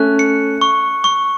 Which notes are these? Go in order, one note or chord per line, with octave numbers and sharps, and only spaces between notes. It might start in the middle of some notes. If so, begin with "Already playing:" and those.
Already playing: A3 C#4 F#6
C#7
C#6
C#6